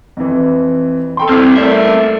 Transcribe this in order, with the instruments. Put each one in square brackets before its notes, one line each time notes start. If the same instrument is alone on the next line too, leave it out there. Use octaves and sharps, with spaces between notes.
[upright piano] F2 E3
A4 G5 C6
[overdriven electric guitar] C4 E4 [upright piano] D6 F6
[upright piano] A3 D5 [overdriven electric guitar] A#3 E5